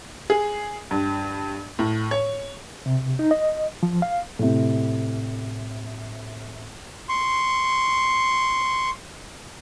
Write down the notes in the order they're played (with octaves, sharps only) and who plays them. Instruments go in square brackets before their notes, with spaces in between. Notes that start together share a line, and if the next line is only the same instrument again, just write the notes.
[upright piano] G#4
G2
A2
C#5
[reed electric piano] C3
D#4
D#5
F3
F5
[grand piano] A2 C3
[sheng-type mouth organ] C6 C#6